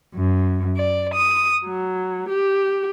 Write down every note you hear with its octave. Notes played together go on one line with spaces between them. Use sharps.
F#2
D5
D#6
F#3
G4